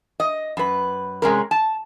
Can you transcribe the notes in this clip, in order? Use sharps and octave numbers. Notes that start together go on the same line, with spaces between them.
D#5
F#2 B4
C3 G#3 C#4 A#4
A5